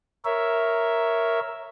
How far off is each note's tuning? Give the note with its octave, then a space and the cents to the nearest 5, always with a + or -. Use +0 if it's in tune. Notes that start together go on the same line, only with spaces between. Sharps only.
A#4 +0 C#5 +0 E5 +0